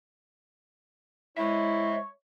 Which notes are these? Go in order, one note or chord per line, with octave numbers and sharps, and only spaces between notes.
G#3 E4 C5 C#5 E5